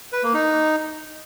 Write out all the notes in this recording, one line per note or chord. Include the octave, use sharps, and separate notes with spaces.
B4
A#3
D#4